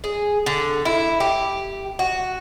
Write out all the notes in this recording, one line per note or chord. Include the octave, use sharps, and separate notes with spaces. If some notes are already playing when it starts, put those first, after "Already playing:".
G#4
D3
E4
G4
F#4